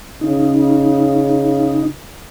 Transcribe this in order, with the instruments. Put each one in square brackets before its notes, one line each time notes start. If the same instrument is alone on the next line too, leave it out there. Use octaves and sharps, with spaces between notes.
[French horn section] C#3 [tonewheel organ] D#4